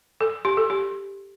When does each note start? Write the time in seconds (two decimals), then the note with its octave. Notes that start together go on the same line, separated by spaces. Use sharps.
0.21 A4
0.45 G4
0.57 A4
0.70 G4